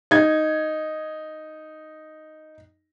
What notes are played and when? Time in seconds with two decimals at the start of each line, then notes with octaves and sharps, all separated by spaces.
0.11 D#4 G#6